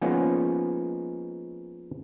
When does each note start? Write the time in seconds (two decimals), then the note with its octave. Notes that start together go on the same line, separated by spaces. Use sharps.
0.02 F3 G#3 A#3 B3 C#4 D#4